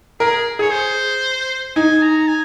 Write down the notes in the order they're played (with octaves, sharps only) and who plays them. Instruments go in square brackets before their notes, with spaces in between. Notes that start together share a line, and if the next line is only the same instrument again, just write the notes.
[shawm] G#4 [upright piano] A#4
[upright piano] G#4 [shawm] C#5
[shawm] C5
[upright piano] D#4 [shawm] G#5
[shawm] A#5
G#5